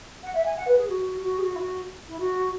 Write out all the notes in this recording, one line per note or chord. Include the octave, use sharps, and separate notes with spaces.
F#5
E5
G#5
F#5
B4
G#4
F#4
F#4
G#4
F#4
E4
F#4
E4
F#4